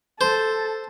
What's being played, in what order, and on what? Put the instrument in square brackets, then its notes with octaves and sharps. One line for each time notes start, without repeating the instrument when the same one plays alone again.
[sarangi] A4 [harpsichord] C5